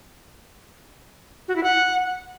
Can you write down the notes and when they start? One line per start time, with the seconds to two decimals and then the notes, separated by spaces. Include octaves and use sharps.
1.48 F#4
1.56 E4
1.63 F#5